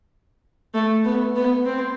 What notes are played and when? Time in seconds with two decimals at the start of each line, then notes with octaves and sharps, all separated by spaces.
0.74 A3
1.05 B3
1.36 B3
1.66 C4